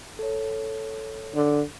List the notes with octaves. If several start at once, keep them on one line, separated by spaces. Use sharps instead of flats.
A4 C#5
D3